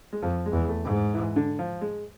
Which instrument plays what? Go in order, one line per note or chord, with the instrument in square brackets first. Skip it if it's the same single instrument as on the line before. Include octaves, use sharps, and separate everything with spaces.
[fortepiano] G#3
[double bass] F2 [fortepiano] F3
[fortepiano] G#3
[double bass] E2
[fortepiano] A3
[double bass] G#2
[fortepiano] G#3
E3
D3
F3
G#3